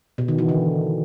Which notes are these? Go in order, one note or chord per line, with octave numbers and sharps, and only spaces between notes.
B2
D#3
E3
D3